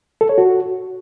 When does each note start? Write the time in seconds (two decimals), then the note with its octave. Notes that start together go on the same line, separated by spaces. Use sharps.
0.21 A4
0.29 C#5
0.38 F#4